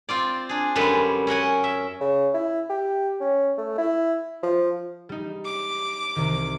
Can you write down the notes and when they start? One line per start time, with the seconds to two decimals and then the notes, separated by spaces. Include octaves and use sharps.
0.09 C4 F4 D5
0.49 D4 G#4
0.76 F#2 D3 G3 G#3 B4 A5
1.27 C#4 A#4 F#5 G#5
1.64 E5
2.01 C#3
2.34 E4
2.70 G4
3.21 C#4
3.58 A3
3.78 E4
4.43 F3
5.09 G3 D#4
5.45 D6
6.16 C2 C3 D#3